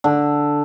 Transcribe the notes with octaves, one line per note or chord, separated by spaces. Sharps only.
D3